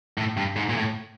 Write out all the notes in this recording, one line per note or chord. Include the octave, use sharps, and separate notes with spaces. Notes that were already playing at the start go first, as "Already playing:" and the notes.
A2
G2
G#2
A#2
A2